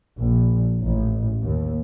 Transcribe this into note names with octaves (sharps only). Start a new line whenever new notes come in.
A#1
A1
D#2